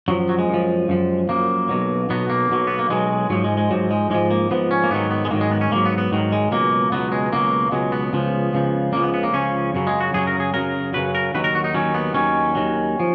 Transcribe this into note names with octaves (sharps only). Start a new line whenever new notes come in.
F#2 F3 F#3
F#3
G#3
F#2 F3
F#2 F3
F#2 F3 A#3
B1 B2 F#3
B1 B2 F#3 B3
A#3
B1 B2 F#3
B3
A#3
B1 B2 F#3 G#3
G#2 F3 F#3
G#3
G#3
G#2 F3 F#3
G#3
G#2 F3 G#3
A#3
G#2 F3 B3
C#4
A#3
G#2 D#3 F#3 B3
B3
G#3
G#2 D#3 F#3 A#3
G#3
B3
C#4
G#2 D#3 F#3 A#3
B3
B3
G#2 D#3 F#3
G#3
C#2 B2 F#3 A#3
C#2 B2 F#3 B3
G#3
C#2 B2 F#3 A#3
C#2 B2 F#3 G#3
B3
C#2 C#3 F3
C#2 C#3 F3
C#2 C#3 F3 A#3
B3
B3
A#3
C#2 C#3 F3 C#4
F#2 C#3 F#3
G#3
F#4
F#2 C#3 F#3 G#4
A#4
G#4
F#2 C#3 F#3 A#4
F#2 C#3 F#3 B4
A#4
D#2 D#3 F#3 B4
A#4
F#4
D#4
D#2 D#3 F#3 C#4
B3
D#2 D#3 F#3 C#4
D#2 D#3 F#3
F3